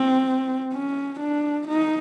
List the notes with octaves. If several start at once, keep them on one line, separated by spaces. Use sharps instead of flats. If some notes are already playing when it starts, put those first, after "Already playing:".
Already playing: C4
C#4
D4
D#4